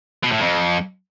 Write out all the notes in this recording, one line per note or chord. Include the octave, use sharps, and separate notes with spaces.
B2
A2
F2